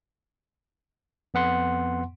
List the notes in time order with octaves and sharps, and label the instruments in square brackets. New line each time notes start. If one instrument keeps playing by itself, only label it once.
[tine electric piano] F2 B3 F#5 C6